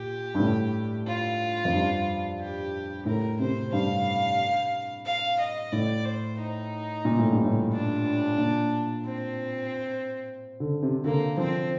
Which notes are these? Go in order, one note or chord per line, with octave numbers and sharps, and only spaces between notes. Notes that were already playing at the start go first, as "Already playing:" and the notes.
Already playing: A#2 G4
G2
A2
F4
F2
G2
G4
A2 A#4
C3 C5
G2 F5
F5
D#5
A2 D5
C5
D#4
A#2
A2
G2
A2
D4
A#2
C4
D3
C3
D3 A#3
F3 C4